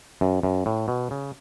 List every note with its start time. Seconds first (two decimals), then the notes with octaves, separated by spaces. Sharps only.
0.21 F#2
0.43 F#2
0.66 A2
0.88 B2
1.11 C#3